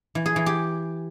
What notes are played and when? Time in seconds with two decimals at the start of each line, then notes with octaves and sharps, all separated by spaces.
0.15 E3
0.26 G#4
0.36 E3
0.46 G4